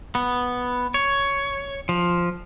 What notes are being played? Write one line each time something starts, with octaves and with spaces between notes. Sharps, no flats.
B3
C#5
F3